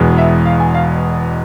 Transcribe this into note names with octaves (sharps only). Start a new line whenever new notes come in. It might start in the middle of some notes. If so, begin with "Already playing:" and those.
Already playing: E1 E2 B2 G#3
E5
F5
G#5
F5